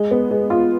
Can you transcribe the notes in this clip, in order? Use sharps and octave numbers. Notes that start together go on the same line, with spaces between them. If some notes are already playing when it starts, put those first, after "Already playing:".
Already playing: G#3
B3
G#3
F4